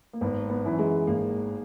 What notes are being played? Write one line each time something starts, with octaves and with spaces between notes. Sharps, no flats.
A#3
G#1 B3
B3
F#2 E3
G#3
G#1 A#3